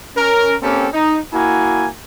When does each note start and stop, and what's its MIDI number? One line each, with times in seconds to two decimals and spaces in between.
0.16 0.54 61
0.16 0.54 70
0.62 0.88 58
0.62 0.88 60
0.62 0.88 61
0.62 0.88 67
0.62 0.88 69
0.93 1.18 63
1.33 1.87 58
1.33 1.87 64
1.33 1.87 66
1.33 1.87 80